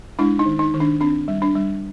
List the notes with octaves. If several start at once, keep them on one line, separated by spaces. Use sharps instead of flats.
G#3 D4 E4
D#4
D#3
D#4
D#3
D4
C4 D4
G3
D4
G3